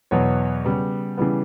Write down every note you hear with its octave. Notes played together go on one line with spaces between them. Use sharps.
E2 B2 F#3 B3 C#5
C#3 G3 B3
C#3 E3 G3 B3